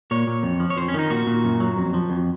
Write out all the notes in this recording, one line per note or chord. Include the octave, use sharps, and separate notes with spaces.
A#2 C#5
A#2
F2
F3
C#5
F2 C5
C#4
D#3 D#4
A#2 F#4
A#2
F#2
F#3
F2
F3
F2